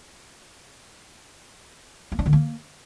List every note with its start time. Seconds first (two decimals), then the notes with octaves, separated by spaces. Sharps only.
2.12 A#3
2.19 D4
2.26 D3
2.33 A#3